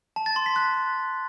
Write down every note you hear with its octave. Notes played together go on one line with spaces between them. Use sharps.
A5
A6
C6
B6
F#6